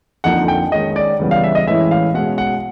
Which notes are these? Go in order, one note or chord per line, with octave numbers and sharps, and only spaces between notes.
F2 D3 F3 A#3 D#4 F#5
G5
D#3 G#3 C#4 D#5
D5
C#3 E3 G3 B3
F5
E5
D#5
A2 E3 G#3 C#4 E4 E5
F5
B2 G#3 C#4 F#5
F#5